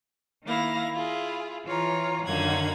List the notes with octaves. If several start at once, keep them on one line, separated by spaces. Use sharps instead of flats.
D#3 A#3 E4 F5 A#6
E4 F4 G#4
E3 F4 C#5 A#5
F#2 D3 D#3 A#3 F#5 G#6